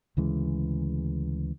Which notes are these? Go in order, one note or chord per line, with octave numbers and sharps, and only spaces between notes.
D2 C#3 E3 G#3